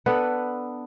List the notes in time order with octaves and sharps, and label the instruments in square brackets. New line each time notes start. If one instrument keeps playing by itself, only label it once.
[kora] B3 D4 A4 B4